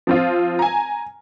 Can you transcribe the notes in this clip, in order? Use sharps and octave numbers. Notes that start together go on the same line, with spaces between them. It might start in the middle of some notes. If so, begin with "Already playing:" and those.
F3 C4 F4
G#5 A#5